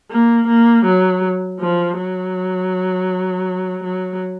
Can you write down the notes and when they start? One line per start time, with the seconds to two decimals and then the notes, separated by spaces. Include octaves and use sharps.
0.11 A#3
0.48 A#3
0.86 F#3
1.60 F3
1.97 F#3
3.84 F#3